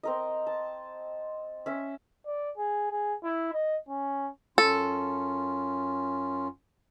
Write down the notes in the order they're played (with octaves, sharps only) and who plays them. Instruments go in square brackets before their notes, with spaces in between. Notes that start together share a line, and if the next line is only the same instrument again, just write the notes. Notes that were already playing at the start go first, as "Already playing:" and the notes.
[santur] C4 A#4 D#5
A5
C#4 E5
[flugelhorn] D5
G#4
G#4
E4
D#5
C#4
[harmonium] F#2 C#4 F4 [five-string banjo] A4